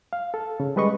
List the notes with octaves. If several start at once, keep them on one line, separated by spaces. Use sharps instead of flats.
F5
A4
C#3
G3 G#3 B4 D#5 C#6